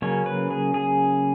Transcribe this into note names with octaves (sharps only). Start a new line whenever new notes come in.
C#3 F#3 A#3 C#4 C#5
B4
G#4
G#4